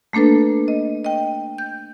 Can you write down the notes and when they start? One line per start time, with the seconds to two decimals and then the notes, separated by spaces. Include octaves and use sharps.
0.13 A3 A#3 D4 A4 B4
0.68 D#5
1.04 D#5 G5
1.58 G6